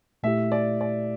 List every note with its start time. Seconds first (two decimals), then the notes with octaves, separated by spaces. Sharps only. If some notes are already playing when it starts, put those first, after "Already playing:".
0.23 A#2 A3 E4 G4 E5
0.52 D5
0.81 D5